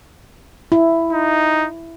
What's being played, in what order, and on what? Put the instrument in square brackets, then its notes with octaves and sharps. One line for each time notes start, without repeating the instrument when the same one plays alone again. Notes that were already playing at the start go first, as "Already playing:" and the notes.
[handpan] E4
[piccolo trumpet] D#4